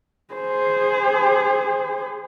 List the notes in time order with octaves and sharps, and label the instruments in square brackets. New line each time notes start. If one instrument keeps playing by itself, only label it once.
[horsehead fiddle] G#4 C5